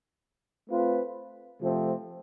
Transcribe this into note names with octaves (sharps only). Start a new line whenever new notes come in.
A3 C4 F4 B4
C3 F3 A3 C4